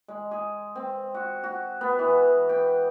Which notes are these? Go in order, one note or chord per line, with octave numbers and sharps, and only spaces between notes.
G#3
G#4
C4
F#4
F#4
B3
E3
G5